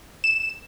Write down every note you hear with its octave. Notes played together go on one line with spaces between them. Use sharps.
E7